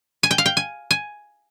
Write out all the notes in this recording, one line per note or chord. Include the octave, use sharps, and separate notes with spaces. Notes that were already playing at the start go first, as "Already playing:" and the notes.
G#5
G5
F5
G5
G#5
G#5